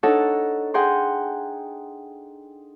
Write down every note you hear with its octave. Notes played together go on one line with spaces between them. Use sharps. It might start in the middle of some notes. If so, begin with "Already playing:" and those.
D4 D#4 A4 C#5 F#5
G#4 F#5 G5 A#5 C6